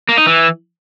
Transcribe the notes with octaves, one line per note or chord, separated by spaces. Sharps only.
A#3
D#4
E3